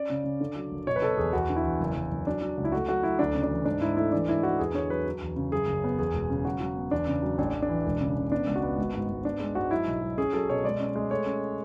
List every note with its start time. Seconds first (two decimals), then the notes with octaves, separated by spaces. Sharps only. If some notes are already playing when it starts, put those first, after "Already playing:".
Already playing: C#4 D5
0.10 C#3
0.24 C#3
0.40 D3
0.56 F#3
0.71 F#1
0.87 B2 C#5
0.96 B4
1.02 B2 A4
1.17 E2 G#4
1.33 E2 F#4
1.49 D3
1.56 E4
1.64 E2
1.80 F#1
1.95 F#1
2.11 F#1
2.27 F#3 D4
2.42 F#3
2.57 C#2
2.65 E4
2.72 A3 F#4
2.89 F#3 F#4
3.03 F#3 E4
3.19 D2 D4
3.35 C#3
3.43 D4
3.50 E3
3.65 G#2 D4
3.81 G#2 E4
3.97 A3 E4
4.12 E3 D4
4.28 G#2 E4
4.43 E3 F#4
4.59 E2 G#4
4.74 D3 C#5
4.90 F#3 B4
5.06 F#3
5.22 E2
5.36 C#3
5.52 F#2 G#4
5.67 F#1
5.84 B3
5.98 E2 G#4
6.14 E1
6.30 C#3
6.45 F#3 F#4
6.61 F#3
6.76 B3
6.91 E2 D4
7.07 C#3
7.23 F#3
7.38 A1 D4
7.55 A1
7.62 D4
7.69 E3
7.86 E1
8.01 C#3
8.17 C#3
8.31 B3 D4
8.47 C#2
8.56 F#4
8.63 B3
8.78 G#1
8.94 G#2
9.09 G#2
9.24 B3 D4
9.40 G#3
9.55 G#2 F#4
9.71 F#3 E4
9.87 B1
10.02 F#3
10.18 C#4 G#4
10.33 F#3 A4
10.49 B2 C#5
10.64 G#3 D5
10.80 C#4
10.96 G#3
11.10 A3 C#5
11.26 C#4